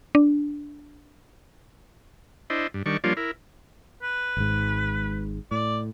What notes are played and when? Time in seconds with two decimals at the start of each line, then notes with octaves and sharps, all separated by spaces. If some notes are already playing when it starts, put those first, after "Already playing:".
0.15 D4
2.50 D4 E4 C5 D#5
2.74 G2
2.86 D#3 G3 D4 C#6
3.04 F3 G3 A#3 D4 F4 C#5
3.17 E4 A#4
4.03 B4
4.37 G#1 G#2
5.51 A2 D5